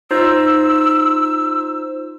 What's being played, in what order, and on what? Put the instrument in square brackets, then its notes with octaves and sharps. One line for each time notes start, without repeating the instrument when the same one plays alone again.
[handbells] D#4 F4 C5 [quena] E6